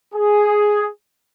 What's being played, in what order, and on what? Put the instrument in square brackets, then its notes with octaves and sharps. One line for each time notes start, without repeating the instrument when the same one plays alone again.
[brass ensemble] G#4